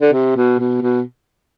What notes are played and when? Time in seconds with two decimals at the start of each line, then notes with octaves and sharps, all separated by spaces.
0.01 D3
0.13 C3
0.36 B2
0.59 B2
0.82 B2